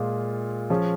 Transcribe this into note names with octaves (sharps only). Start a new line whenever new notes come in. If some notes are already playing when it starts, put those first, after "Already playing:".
Already playing: A#2 G#3 F4
F3 C#4 G#4